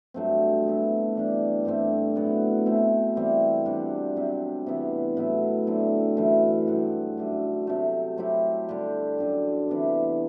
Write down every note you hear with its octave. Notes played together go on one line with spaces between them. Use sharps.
G2 F#3 A3 C4
F#3 B3 E4
E3 G3 D4
G2 D3 A3 C4
A2 F#3 B3 F#4
B2 A3 C4 E4
E3 G3 C4 E4
C3 G3 D4 F#4
C3 F#3 C4
C3 E3 B3 E4
A2 F#3 B3 E4
D3 F#3 C4 E4
F#2 E3 A3
G2 F#3 C4 F#4
F#2 D3 A3
C3 F#3 A3
F#3 C4 E4 G4
D3 G3 D4 G4
F#2 D3 F#3
C3 E3 B3 D4